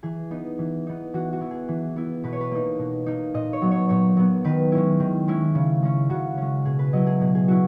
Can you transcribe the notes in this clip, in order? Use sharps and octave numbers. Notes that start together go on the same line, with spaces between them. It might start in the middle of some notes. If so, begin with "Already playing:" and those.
E3 G#4
B3 D#4
E3
B3 D#4
E3 F#4
F#4
B3 E4
G#4
E3
B3 E4
B2 B4
C#5
B4
A#3 D#4
B2
A#3 D#4
A#2 D#5
C#5
F#3 B3
C#5
A#2 C#5
F#3 B3
D#3 B4
G#3 C#4 E4
D#3
G#3 C#4 E4
C#3
G#3 C#4
C#3 F#4
G#3 C#4
B2 G#4
B4
F#3 C#4 E4 D#5
G#4
B2 G#4
G#4
F#3 C#4 E4 F#4